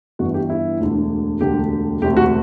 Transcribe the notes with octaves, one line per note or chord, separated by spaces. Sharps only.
G1 G2 E3 F#4
G4
E4
E1 D2 D3
E1 D2 D3 G4
E1 D2 C3 G4
F#4